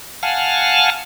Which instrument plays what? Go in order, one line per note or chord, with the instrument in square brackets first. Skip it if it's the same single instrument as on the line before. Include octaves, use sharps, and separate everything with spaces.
[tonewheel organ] F5 F#5 G#5 A5 F6